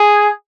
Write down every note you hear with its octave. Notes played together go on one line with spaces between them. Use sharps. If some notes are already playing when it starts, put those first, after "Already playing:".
Already playing: G#4